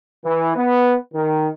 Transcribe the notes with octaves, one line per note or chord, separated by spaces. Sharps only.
E3
B3
D#3